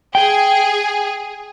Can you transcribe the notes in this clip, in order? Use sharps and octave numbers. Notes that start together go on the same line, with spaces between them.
G#4 G5